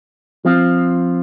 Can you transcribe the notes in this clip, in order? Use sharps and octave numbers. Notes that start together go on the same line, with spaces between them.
F3 C4 F4